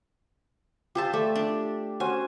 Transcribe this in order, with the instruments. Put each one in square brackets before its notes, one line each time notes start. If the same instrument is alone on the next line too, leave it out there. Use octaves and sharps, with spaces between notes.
[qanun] F4 C5 A5 [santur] G4 E6
[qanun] A3 [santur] D5
[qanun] D4
[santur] C#4 F#4 C5 [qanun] G#5